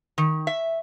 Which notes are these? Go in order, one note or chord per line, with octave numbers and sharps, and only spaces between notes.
D#3
E5